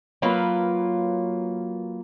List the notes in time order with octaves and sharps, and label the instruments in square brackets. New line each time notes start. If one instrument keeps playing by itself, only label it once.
[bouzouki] F#3 A#3 F4 B4